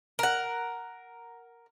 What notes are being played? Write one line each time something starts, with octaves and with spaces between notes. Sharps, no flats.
A#4 F#5